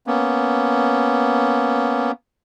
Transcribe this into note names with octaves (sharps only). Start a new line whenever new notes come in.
A#3 B3 C#4